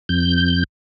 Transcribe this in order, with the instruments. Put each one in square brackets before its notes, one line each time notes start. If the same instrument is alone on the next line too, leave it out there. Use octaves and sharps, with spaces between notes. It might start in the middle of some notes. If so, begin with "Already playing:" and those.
[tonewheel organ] F2 G6